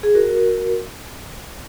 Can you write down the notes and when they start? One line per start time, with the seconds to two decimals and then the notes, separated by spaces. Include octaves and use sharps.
0.03 G#4
0.15 F#4 A#4